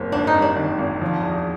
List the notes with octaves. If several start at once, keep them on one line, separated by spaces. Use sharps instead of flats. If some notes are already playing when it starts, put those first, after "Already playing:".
Already playing: F#1 C4
G#1 D4
D#4
G2
D4
D#3
G#1
F3
E2